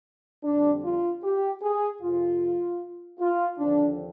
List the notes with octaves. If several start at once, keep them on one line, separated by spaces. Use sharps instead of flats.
F2 D3 G3 C4 D4
F4
G4
G#4
F2 C3 F3 F4
F4
D#2 D3 F3 C4 D4